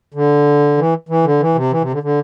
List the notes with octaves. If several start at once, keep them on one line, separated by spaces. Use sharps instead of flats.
D3
E3
E3
D3
E3
C3
E3
C3
D3
D3